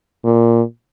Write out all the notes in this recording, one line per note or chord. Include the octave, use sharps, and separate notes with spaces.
A#2